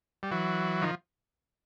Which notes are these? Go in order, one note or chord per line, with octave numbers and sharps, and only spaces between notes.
G3
E3 F#3
D#3 F3